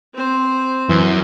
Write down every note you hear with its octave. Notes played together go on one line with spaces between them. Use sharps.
C4 C5
F#2 E3